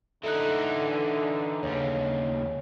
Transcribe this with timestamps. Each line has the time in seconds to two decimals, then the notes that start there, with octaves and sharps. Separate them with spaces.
0.24 D3 E3 D#4 A4 F#6
1.63 D#2 C#3 C#5